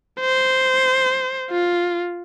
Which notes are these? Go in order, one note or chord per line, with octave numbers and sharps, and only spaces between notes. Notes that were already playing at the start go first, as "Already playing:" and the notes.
C5
F4